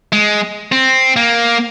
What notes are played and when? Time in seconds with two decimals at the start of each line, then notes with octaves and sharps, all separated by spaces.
0.12 G#3
0.72 C4
1.16 A#3